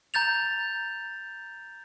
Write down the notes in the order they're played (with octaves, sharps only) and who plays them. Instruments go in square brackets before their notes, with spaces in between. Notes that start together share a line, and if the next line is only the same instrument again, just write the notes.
[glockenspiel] A#5 G6 A6 F7